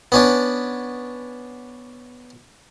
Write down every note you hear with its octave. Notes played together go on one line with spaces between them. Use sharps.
B3 C#4 D4